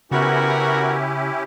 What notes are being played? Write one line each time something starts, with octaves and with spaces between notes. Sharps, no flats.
C#3 B3 C#4 E4 F#4 G4 A#4